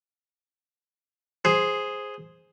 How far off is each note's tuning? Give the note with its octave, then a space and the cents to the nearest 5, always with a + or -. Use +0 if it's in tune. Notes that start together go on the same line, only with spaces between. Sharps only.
G#4 +0 C5 +0